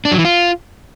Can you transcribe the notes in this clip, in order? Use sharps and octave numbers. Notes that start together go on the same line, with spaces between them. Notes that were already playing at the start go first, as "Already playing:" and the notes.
D4
F#3
E3
F4